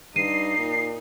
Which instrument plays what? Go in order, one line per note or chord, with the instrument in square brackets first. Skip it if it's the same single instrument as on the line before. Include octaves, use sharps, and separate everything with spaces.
[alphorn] G2 [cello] D#4 [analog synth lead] C7 [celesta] D#7
[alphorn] A#2